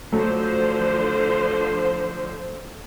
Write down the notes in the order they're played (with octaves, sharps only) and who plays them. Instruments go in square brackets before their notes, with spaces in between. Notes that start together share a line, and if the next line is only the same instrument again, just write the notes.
[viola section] D3 F3 C5 [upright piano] F#3 A3 A4